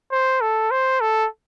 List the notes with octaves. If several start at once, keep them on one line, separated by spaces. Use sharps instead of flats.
C5
A4
C5
A4